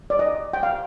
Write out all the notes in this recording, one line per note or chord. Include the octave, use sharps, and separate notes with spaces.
D5
D#5
G5
F5